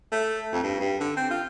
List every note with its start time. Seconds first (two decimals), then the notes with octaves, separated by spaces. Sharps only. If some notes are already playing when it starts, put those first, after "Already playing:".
0.12 A3
0.52 F2
0.63 G2
0.80 G2
1.00 D3
1.17 C4
1.31 F4